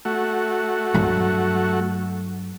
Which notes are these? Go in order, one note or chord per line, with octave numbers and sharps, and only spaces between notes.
A3 F#4
G2 F#3